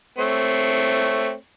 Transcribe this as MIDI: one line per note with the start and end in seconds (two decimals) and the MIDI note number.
0.19 1.34 57
0.19 1.34 60
0.19 1.34 73